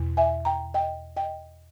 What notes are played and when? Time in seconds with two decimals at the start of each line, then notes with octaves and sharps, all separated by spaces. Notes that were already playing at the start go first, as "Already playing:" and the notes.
Already playing: E2 B2
0.17 E5 G#5
0.45 G5 A#5
0.74 D#5 G5
1.17 D#5 G5